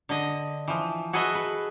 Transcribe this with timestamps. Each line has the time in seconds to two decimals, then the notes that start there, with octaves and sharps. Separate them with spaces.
0.09 D3 D#5
0.68 E3 F3
1.13 F#4 G#4 A4 B4 D#5 E5
1.35 B4